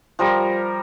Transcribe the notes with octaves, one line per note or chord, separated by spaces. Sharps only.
F3 G3 A#4